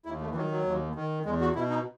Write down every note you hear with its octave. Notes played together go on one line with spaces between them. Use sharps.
D#2 E4
A3
E3
D#3 F#3
F#3
D#2
D#3
E2 G#3
F#4
B2 E4
D#4